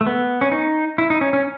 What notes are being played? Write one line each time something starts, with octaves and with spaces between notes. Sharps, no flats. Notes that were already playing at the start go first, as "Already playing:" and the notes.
A3
B3
C#4
D#4
E4
D#4
C#4
C#4